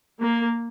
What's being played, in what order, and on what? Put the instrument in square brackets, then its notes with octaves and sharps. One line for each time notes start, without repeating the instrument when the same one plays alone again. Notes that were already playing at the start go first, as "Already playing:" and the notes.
[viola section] A#3